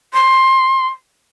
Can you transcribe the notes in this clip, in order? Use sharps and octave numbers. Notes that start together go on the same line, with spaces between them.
C6